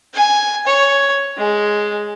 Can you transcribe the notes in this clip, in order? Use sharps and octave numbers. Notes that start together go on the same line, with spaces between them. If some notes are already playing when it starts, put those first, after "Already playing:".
G#5
C#5
G#3